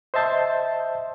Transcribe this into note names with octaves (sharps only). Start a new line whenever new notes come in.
C5 D#5 E5 A5 C6 G6